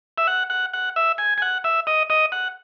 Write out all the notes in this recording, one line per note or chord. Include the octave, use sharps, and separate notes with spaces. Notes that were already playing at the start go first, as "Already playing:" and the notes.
E5
F#5
F#5
F#5
E5
G#5
G#5
F#5
E5
D#5
D#5
F#5